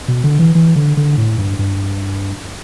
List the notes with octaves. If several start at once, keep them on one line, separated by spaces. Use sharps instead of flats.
B2
D3
E3
E3
D3
D3
A2
G2
G2